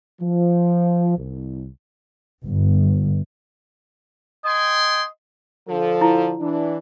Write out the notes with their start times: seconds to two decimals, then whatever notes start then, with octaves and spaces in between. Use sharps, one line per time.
0.21 F3
1.18 C2
2.46 G1
4.45 D#5 G5 G#5 C6
5.68 D3 F3 A4
6.01 E4
6.41 E3 D4